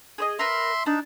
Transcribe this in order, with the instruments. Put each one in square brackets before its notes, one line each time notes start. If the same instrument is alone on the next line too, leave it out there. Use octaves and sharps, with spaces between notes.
[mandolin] G#4 C5 D#5
[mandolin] A#4 B4 [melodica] E5 C6
[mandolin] D4 [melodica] D#4